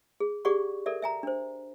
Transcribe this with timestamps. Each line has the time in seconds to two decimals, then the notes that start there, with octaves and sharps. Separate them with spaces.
0.20 G#4
0.45 G4 G#4 D5 F#5 C#6
0.86 A4 A#4 D5 E5
1.02 E5 G#5 A#5
1.23 D4 C5